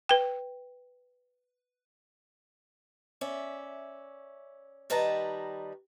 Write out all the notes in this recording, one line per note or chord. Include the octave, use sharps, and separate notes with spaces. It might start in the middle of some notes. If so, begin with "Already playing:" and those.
B4 G5
C#4 D5 E5
D#3 G3 B4 D#5 A5 A#5